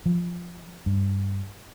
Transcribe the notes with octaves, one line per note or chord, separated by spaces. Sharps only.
F3
G2